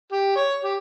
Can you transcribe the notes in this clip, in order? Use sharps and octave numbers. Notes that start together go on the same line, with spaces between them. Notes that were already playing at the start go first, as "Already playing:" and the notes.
G4
C#5
G4